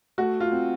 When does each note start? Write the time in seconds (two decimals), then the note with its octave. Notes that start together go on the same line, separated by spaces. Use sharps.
0.18 A3 F#4
0.40 F4
0.52 C4